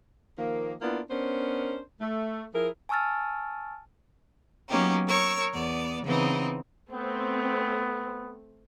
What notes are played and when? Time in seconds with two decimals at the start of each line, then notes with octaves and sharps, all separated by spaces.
0.38 D#3 F3 A#3
0.81 A#3 B3 D4 E4 F4
1.10 B3 C#4 D4 A#4 C5
2.01 A3
2.54 F3 E4 G#4 A#4
2.89 G#5 A5 C#6 E6 F6 A6
4.69 F#3 A#3 B3 C#4 D#4 G4
5.07 A#4 C#5 C#6 E6
5.54 E2 B3 D5
6.05 C#3 E3 B3 C4 D#4
6.92 A3 B3 C4